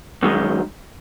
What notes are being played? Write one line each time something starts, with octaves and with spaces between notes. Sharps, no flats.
F#2 D#3 G#3